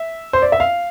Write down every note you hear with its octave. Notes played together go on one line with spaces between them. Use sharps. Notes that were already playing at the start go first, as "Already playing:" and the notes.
Already playing: E5
C5
D5
E5
F5